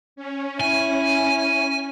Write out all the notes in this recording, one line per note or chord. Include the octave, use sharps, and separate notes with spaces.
C#4
E4 G#5